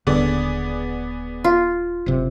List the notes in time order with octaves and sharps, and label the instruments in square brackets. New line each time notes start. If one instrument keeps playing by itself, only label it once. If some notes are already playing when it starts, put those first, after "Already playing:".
[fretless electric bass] D#1 D3 [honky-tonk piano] B3 G#4 D5
[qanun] F4
[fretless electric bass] F#1 C3